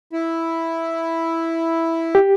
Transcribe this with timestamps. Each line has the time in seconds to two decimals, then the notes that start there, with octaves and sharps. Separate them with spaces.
0.13 E4
2.15 G4